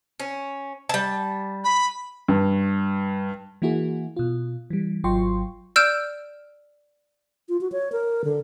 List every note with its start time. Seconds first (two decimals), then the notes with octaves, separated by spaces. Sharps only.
0.20 C#4
0.89 G3 A5
1.64 B5
2.28 G2
3.62 E3 A#3 E4 F#4 G#4
4.16 B2 F4
4.70 E3 G3
5.04 G#1 F#3 F4 G5 C6 C#6
5.76 D5 E6 F6 G6 D7 E7
7.49 F4
7.61 F#4
7.72 C#5
7.92 A#4
8.24 D3